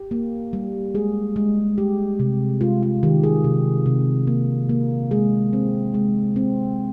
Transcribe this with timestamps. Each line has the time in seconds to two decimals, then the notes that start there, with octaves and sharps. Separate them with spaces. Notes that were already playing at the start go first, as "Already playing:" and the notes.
Already playing: G4
0.11 A#3
0.53 G3
0.95 G#3 G#4
1.36 G#3
1.78 G3 G4
2.19 C3
2.61 G#3 F4
2.83 F4
3.03 D#3 G4
3.23 G#4
3.44 C3
3.86 C3
4.27 A#3
4.69 A#3
5.11 G#3 G#4
5.53 C4
5.94 G#3
6.36 C4